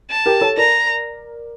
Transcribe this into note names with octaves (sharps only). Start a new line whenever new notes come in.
A5
G4 A#4
A4 C#5
A#4 D5 A#5